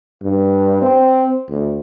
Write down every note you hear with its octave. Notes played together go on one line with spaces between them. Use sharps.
G2
C4
D2